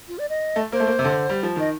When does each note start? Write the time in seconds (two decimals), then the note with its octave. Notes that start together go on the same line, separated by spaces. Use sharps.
0.08 F4
0.19 D5
0.30 D#5
0.56 A3
0.72 A#3 C5
0.80 A3
0.87 A#3
0.99 C3
1.04 D3
1.29 G3
1.43 F3
1.56 D#3 D#5